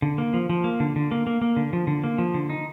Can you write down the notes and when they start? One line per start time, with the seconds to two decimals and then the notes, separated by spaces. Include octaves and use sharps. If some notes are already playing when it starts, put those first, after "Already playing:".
0.02 D3
0.18 A#3
0.34 F3
0.50 F3
0.64 A#3
0.80 D3
0.96 D3
1.11 A#3
1.27 A#3
1.42 A#3
1.56 D3
1.73 F3
1.87 D3
2.04 A#3
2.18 F3
2.34 D3
2.50 D#4